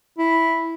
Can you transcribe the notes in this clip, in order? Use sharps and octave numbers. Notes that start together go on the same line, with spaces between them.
E4